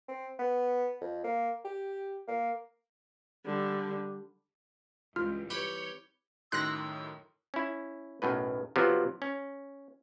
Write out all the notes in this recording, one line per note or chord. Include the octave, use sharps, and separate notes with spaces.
C4
B3
F2
A#3
G4
A#3
D3 G3
C#2 E3 G3 C4 F4 F6
G4 B4 C#5 G5
F#2 A2 D#3 C6 E6 F#6 A#6
C#4 E4
B1 F#2 A2 B4
C3 F3 F#3 B3
C#4